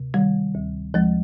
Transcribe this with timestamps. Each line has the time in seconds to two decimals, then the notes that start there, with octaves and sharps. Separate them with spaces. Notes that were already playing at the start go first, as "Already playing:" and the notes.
Already playing: D2 C3
0.14 D#3 G3
0.54 D2
0.94 D2 F3 G#3